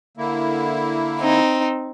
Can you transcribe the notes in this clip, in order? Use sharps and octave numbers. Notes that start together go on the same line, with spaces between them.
D3 A#3 E4
C4 D#4